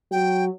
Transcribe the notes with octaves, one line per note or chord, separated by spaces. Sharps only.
F#3 G5